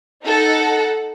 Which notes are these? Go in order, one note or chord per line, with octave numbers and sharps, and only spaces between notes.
D#4 A4 F#5